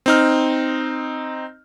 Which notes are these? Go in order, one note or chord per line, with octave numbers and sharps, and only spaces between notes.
C4 D#4 F6